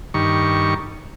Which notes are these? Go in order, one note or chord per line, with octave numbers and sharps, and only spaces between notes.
G2 D#3 C#6